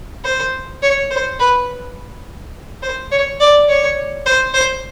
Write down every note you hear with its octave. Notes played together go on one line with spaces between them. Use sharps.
C5
C#5
C5
B4
C5
C#5
D5
C#5
C5
C5